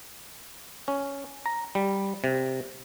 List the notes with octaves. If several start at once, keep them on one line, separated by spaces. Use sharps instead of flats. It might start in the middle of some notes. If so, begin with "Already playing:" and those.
C#4
A#5
G3
C3